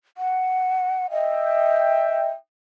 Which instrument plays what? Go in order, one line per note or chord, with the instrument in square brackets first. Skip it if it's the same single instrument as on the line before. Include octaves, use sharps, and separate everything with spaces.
[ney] F#5
[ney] D#5 [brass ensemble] E5 G5